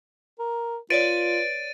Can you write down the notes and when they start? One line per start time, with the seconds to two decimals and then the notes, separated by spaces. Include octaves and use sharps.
0.39 A#4
0.90 F4 B4 C#5 D5 A6 D7 D#7